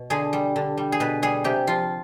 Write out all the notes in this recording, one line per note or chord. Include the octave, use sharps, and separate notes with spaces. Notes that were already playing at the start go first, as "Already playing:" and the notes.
Already playing: B2
D3 G#4
G3
D3
G3
G#4
B2 B4
G3 G#4
C3 G4
F3 F4